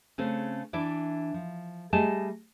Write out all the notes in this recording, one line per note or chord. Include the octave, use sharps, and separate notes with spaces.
C#3 A3 C4 C#4
E3 D4 E4 D5
F3
G3 A3 G#4 D#5 G#5 A5